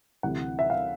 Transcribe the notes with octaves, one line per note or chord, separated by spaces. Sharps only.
D2 C3 E3 G3 F#5
E5
F5